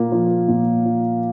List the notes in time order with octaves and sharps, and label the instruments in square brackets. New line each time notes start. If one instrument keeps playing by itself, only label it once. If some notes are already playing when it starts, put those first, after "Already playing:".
Already playing: [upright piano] A#2 A#3
F3
A#2
F3